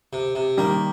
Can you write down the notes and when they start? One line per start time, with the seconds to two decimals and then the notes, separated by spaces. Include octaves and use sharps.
0.13 C3
0.35 C3
0.57 D#3 G3 A#3